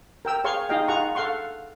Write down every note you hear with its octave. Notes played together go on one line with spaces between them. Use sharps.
A#4 G5 E6
G#4 C#5 F5 C6 C#6
D#4 F4 G#4 D#5 F5 G5
D#4 F4 G#4 F#5 A#5 C#6
A4 F5 F#5 C6 C#6